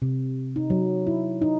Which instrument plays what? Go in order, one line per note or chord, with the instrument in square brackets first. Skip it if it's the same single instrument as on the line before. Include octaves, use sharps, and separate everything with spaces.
[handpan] C3
D#4
F#3
E4
D#4